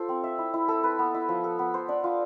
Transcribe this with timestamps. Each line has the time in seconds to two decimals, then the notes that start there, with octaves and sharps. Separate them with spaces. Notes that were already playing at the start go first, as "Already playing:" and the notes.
Already playing: F4 A4 C5
0.09 C4
0.24 E5
0.39 E4
0.54 E4
0.68 A4
0.84 B4
0.99 B3
1.14 E4
1.29 F3
1.44 A4
1.59 B3
1.74 C5
1.89 D4
2.04 F4